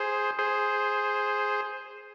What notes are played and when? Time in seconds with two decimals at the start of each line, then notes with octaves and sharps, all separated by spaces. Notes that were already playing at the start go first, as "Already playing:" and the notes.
Already playing: G#4 C5
0.39 G#4 C5